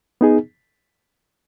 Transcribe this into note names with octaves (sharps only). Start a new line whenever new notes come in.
B3 D#4 G#4